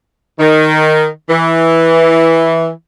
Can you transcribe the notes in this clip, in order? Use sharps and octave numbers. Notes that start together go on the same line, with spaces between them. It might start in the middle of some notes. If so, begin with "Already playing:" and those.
D#3
E3